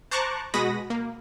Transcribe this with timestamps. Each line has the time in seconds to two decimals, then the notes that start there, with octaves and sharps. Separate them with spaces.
0.11 C5 A5 A#5 C#6 D6 F#6
0.54 B2 G#3 F#4 B5 D#6 A#6
0.90 A#3